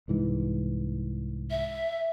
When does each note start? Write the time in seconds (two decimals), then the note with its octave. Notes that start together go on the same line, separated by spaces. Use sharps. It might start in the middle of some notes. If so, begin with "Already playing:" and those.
0.08 C2 G#2 E3
1.50 E5